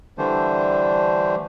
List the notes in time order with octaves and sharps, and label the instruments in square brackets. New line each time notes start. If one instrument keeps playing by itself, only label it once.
[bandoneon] D3 E3 G3 A3 D4 C5